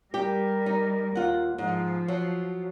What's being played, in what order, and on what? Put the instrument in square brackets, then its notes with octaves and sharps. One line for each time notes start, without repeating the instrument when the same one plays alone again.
[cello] G3 A#4 [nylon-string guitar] G4
[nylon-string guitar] D#4
[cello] D#2 [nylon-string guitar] F4 F#5
[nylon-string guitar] G#2 [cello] F3
[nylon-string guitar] F#3